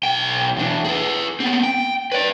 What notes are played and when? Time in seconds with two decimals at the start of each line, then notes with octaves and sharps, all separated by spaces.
0.03 B1 G5
0.57 E2 D4
0.84 G#4 B4
1.40 B3 C4
1.63 G5
2.12 B4 D5